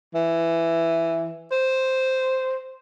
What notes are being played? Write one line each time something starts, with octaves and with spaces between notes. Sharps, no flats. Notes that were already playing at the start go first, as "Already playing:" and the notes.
E3
C5